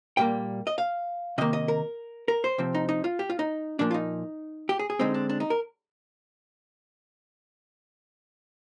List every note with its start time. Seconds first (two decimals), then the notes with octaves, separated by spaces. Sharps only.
0.17 A#2 G3 A#3 G5
0.67 D#5
0.78 F5
1.38 C3 D#3 A#3 D#5
1.53 D#5
1.68 A#4
2.28 A#4
2.44 C5
2.58 C3 F3 C4
2.74 D#4
2.89 D#4
3.04 F4
3.19 G4
3.30 F4
3.39 D#4
3.79 A#2 F3 A#3 D4
3.91 F4
3.94 D#4
4.69 G4
4.79 G#4
4.90 G#4
4.99 D3 G#3 C4 D#4
5.14 D4
5.29 D4
5.40 D#4
5.50 A#4